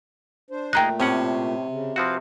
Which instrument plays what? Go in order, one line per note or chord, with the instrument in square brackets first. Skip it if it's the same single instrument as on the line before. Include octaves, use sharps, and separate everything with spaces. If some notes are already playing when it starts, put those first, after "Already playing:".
[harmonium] D4 C5
[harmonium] A#2 A3 [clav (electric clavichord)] D#4 G#4 A#4 [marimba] G5 A#5 F#6
[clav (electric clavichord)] A2 C#4 F#5 [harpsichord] C3
[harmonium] C#3
[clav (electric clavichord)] F3 C4 F#4 [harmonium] B4 F5